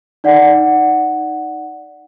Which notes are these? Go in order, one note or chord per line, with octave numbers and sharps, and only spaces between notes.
D#4 D5 F#5